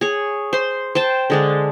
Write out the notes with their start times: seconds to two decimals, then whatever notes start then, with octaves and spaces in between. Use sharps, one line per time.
0.01 G#4 C#5
0.53 C5 C6
0.95 C5 G5 A5
1.30 D3 G#3 D4